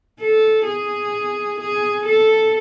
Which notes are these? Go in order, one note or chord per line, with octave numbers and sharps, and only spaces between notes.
A4
G#4
G#4
A4